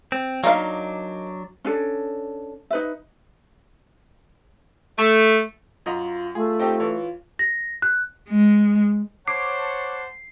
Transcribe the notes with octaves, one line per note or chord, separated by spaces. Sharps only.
C4
F#3 A#3 D4 D#4 F5
C#4 D4 A4
D#4 B4 E5
A3
F#2 F4 D#5 A#5
A3 F4 G#4
C4 D#4 G4
E3 C#5
A#6
F#6
G#3
C5 C#5 F#5 A5 D6 C7